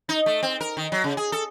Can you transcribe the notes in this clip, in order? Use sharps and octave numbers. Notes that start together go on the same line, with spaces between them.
D#4
A3
C4
A#4
D#3
F#3
C#3
G#4
A4